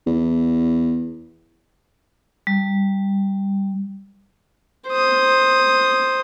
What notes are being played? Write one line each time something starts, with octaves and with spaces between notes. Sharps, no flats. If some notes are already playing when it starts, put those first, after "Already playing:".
E2
G3
C5 D#6